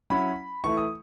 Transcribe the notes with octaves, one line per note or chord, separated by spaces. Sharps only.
F#3 C#4 E4 B5
E3 A3 E4 C#6
D#6